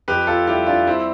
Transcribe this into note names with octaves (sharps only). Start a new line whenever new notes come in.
F2 G4 B4
F4 A4
G3 E4 G4
D4 F4
G3 C4 E4